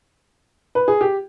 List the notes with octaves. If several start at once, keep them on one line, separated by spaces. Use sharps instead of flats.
B4
G#4
G4